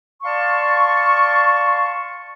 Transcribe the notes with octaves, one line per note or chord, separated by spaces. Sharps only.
D5 F5 A5 C6 C#6